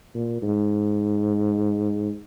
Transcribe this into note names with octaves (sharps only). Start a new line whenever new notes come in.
A#2
G#2